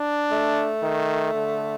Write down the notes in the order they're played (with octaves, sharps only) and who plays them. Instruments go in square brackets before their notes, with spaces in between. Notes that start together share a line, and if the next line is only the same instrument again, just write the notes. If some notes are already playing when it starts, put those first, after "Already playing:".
Already playing: [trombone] D4
[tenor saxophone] A3
[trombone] D#3
D3